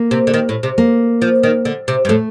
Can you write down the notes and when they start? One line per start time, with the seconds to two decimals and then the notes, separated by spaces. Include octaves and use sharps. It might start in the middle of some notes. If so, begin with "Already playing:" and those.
Already playing: A#3
0.11 C3
0.27 D3
0.34 D#3
0.49 A2
0.63 C3
0.78 A#3
1.22 F3
1.43 D#3
1.65 D3
1.88 C3
2.05 G2
2.09 A2 A3